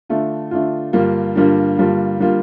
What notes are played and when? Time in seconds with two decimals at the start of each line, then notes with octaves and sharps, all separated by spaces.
0.10 D3 A3 D4 F4
0.51 D3 A3 D4 F4
0.93 G2 D3 G3 A#3 F4
1.36 G2 D3 G3 A#3 F4
1.78 G2 D3 G3 A#3 F4
2.20 D3 G3 A#3 F4